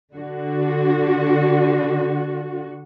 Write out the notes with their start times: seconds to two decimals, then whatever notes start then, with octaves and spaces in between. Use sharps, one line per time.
0.14 D3 F#4